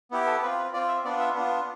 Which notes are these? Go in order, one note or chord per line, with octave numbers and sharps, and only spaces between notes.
B3 E4 G4
A4
C4 F4 B4
B4
C4 F4 D5
E5
B3 D4 F4 D5
E5
B3 D4 F4